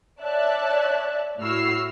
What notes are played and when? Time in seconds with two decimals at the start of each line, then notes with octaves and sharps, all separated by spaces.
0.22 C#5 D5 E5 A5 F#6
1.40 A2 E4 F#4 E6 F6 C7